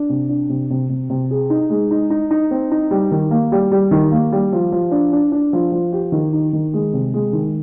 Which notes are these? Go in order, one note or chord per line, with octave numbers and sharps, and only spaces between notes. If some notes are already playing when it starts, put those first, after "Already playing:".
Already playing: D4
C3
D4
C3
C3
C3
C3
G#4
D#4
G#3
D#4
D#4
D#4
C4
D#4
G3
D#3
A#3
G3
G3
D#3
A#3
G3
F3
F3
D4
D4
D4
F3
F3
G4
D#3
D#4
D#3
G#3
C3
G#3
D#3